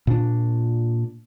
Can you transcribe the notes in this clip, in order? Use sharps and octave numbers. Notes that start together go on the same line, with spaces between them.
A#2 D4